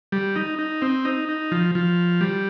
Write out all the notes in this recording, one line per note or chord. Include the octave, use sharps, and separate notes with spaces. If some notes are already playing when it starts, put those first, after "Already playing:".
G3
D#4
D#4
C4
D#4
D#4
F3
F3
G3